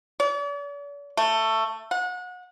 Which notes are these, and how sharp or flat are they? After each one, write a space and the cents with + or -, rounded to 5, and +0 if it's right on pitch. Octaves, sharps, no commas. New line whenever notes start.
D5 -45
A3 +15
F#5 -30